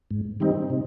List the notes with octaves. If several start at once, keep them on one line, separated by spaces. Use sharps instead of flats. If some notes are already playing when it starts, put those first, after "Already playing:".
G#2
D#3 G3 C4 D#4
C3